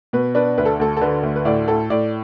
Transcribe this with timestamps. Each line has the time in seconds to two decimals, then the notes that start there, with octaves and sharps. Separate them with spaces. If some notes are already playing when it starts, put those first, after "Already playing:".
0.13 B2 B4
0.35 D4 B4
0.58 D2 B4
0.65 A4
0.80 D2 A4
0.97 A4
1.01 D3 B4
1.23 D2
1.36 B4
1.45 A2 D5
1.68 A2 A4
1.90 A2 D5